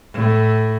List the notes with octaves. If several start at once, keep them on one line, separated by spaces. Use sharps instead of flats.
A2